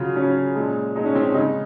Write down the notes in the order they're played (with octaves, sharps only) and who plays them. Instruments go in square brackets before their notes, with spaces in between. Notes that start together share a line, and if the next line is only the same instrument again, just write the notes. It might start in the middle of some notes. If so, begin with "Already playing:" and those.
Already playing: [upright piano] C#3 F#3 F4
C#3 F#3 C#4
A#2 G#3
A#2 G#3 D#4
C#4
C4
C#4
C#3 G#3 D#4